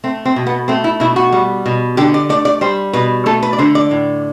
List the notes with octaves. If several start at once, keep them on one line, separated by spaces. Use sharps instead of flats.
A3 C4
C4
B2
B3
A3 C4
E4
B2 E4
F#4
G3
B2
D3 G4
D5
A3 D5
D5
G3 C5
B2 B4
A3 A4
B4
D5
D3 C5
D5
A2